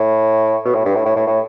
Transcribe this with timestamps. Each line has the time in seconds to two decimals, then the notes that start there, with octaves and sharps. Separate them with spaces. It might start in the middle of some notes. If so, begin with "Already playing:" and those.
Already playing: A2
0.65 B2
0.75 A2
0.85 G2
0.95 A2
1.06 A2
1.16 A2
1.27 A2